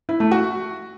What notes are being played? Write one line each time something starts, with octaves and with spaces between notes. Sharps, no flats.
E4
A3
F#4